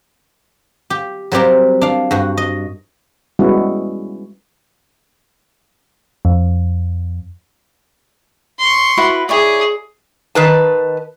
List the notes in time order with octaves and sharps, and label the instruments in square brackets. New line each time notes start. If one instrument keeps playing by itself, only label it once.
[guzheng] G4
F#3 G3 C4 G4 A#4
D4 F5
G2 F#4
D#5
[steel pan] G3 G#3 B3 C#4 E4 F#4
[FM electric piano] F2
[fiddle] C6 C#6
[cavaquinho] E4 F#4 B4
[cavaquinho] E4 C#5 D5 [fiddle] G#4
[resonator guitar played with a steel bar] D#3 B4 A5